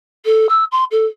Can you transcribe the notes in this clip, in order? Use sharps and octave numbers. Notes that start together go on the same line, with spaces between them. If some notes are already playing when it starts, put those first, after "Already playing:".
A4
E6
C6
A4